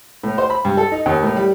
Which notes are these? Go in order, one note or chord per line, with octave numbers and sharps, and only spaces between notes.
A2
C5
B5
G2
A4
D#4
D#2
A2
G3